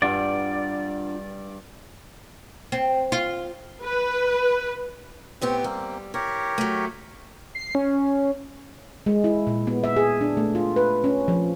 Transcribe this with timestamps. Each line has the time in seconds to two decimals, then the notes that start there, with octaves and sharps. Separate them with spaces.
0.02 G2 D4 F4 D5 F#5
2.72 C4
3.12 F4
3.84 B4
5.41 A2 B3 C4 G4
5.64 G3 A#3 C4
6.14 E4 G4 A#4 C#5
6.58 F#3 A3
7.55 C7
7.75 C#4
9.06 G#3
9.24 E4
9.47 A#2
9.67 B3
9.84 E5
9.97 G#4
10.21 D4
10.37 A3
10.55 F4
10.76 B4
11.04 C#4
11.28 F3